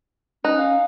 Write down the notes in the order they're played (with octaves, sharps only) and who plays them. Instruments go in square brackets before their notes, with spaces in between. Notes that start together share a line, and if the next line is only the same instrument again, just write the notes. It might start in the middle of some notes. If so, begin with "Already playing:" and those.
[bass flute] C#4 [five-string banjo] D#4 [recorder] F#6
[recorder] F5